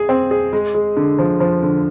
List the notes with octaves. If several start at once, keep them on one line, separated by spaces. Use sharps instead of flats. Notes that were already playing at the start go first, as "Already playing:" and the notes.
Already playing: G#4
C4
G#4
G#3
G#3
D3
F3
F3
D3